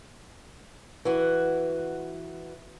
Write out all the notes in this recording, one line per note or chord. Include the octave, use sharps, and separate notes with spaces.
E3 F#4